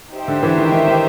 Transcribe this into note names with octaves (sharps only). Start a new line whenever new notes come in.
D#4 G4 C5 E5 G5
D3
D3 E3
D#3
D#3
D#3